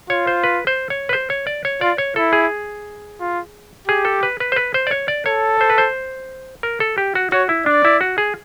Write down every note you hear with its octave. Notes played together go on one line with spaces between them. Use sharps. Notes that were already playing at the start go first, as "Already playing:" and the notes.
F4 C#5
C5
B4
C5
C#5
B4
C5
C#5
D5
C#5
F4 D5
C#5
E4 A4
G#4
F4
G4 G#4
A4
B4
B4
C5
B4
C5
D5
C#5
D5
A4 C#5
C5
B4
C5
A#4
A4
G4
F#4
F#4 C#5
E4
D4 D5
E4
F#4
G#4